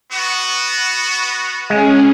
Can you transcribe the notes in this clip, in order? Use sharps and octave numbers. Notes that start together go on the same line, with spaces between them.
B3 F#4
G#3 C#4 G#4